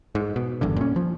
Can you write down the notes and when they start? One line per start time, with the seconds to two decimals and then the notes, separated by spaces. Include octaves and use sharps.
0.15 G#2
0.36 B2
0.61 F#1 E2 G2 D3
0.76 A#2 C#4
0.96 F3